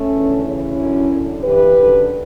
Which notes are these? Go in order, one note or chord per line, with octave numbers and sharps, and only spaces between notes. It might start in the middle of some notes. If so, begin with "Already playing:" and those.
Already playing: A3 C#4
E2 D3
D2 C#3 E3 C#4 E4
F#2 D3
F#2 D3
G2 E3 G4 B4
F#2 D3